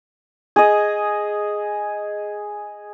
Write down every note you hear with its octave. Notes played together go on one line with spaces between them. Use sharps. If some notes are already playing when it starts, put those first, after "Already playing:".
G#4 D#5